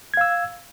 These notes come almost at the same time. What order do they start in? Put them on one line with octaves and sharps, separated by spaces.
G#6 F5 E6